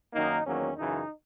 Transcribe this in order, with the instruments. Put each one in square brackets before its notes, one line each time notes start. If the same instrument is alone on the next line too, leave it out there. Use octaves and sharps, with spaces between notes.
[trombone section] F#2 D#3 A#3 D#4
E2 D#3 F#3 A#3 C#4
F#2 C#3 E3 D#4